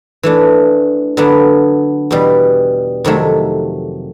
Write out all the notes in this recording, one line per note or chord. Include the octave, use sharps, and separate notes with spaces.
E3 A3 D4
D3 F#3 B3 D4
E2 B2 G3
F2 C3 D#3 F#3 A3